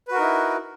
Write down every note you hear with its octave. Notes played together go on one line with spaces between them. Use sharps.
D#4 E4 F#4 A#4 B4